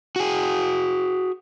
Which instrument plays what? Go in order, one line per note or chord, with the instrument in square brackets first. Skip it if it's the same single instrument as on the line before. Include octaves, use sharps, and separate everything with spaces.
[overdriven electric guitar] F#4 G#4